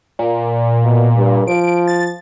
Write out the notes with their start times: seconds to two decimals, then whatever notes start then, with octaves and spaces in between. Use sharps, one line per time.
0.19 A#2
0.84 B2
1.15 G2
1.47 F3 D7
1.87 A6